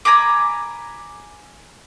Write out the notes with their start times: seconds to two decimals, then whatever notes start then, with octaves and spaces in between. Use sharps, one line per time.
0.05 G#5 A#5 B5 D6